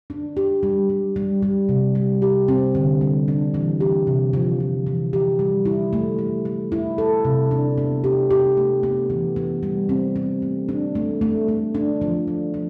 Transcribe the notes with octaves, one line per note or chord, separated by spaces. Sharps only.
D4
G4
G3
G3
G3
G3
C3
G3
G4
C4
D3
G3
D4
E3
G4
C3
F3
F3
E3
G4
G3
E4
A3
A3
A3
E4
A4
C3
D4
B3
G4
G4
A3
B3
E3
B3
G3
C4
C4
A3
D4
A3
A3
A3
D4
F3
A3
F3